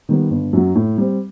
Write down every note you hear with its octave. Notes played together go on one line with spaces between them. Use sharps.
D#3 G3 B3
G1
F#2 F#3
A2
G3 C4